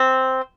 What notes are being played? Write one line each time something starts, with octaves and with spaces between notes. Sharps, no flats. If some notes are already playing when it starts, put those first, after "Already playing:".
Already playing: C4